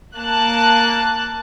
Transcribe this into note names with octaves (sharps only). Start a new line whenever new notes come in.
A#3 A5 F#6